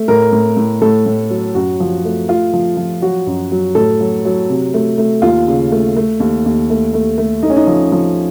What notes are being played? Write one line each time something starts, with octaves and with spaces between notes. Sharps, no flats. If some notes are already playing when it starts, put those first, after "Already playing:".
Already playing: A3
A2 A#4
A2
A2
A2 A4
A2
F#3
F#2 F#4
F3
A3
A3 F4
F3
F3
F#3 F#4
F#2
F#3
A2 A4
F#3
F#3
C3
A3
A3
D#2 F4
C#3
A3
A3
D#2
D#2
A3
A3
A3
A3 D#4
C#4
D#4
F3
F3